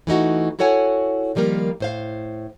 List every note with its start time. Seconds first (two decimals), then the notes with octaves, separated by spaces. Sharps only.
0.07 E3 A3 D#4 F#4
0.59 E4 F#4 A4 C#5 F#5 G#5
1.35 D#3 F3 G3 A#3 A#4
1.80 A2 C5 F5